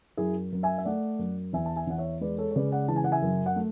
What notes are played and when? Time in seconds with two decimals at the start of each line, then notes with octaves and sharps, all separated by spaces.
0.17 F#2 E4 G#4
0.52 F#2
0.63 E5 G#5
0.78 E5
0.85 A3 D5 F#5
1.19 F#2
1.53 E2 E5 G#5
1.66 A5
1.76 E5 G#5
1.87 E2 F#5
1.98 C#5 E5
2.21 G#3 B4 D5
2.38 A4 C#5
2.51 C#5
2.56 C#3 B4 D5
2.71 D5 F#5
2.88 E3 A5
2.96 G#5
3.04 F#5
3.12 E5 G#5
3.22 F#2
3.46 F#5
3.56 A3